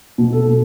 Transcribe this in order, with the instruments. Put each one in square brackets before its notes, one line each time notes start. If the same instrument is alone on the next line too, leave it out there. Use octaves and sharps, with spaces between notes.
[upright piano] B2
A4
B2